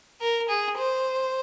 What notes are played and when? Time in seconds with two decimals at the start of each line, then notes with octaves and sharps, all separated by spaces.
0.21 A#4
0.49 G#4
0.78 C5